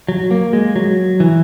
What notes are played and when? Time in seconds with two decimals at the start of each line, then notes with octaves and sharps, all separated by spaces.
0.08 F#3
0.31 A#3
0.53 G#3
0.76 F#3
1.20 E3